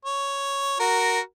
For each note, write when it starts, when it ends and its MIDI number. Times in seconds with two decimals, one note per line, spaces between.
0.05 0.79 73
0.80 1.20 66
0.80 1.20 70